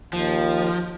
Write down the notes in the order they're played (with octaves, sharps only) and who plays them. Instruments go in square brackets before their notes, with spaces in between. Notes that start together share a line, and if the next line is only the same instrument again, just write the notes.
[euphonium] D#2 [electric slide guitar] F3